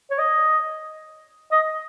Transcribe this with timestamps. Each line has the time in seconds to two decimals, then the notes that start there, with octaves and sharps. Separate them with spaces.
0.10 C#5
0.18 D#5
1.52 D#5